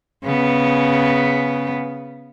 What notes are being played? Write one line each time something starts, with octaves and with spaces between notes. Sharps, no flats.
C#3 B3